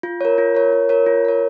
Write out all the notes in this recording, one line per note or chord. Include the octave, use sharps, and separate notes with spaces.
F4
A#4 C#5
F4
A#4 C#5
F4
A#4 C#5
F4
A#4 C#5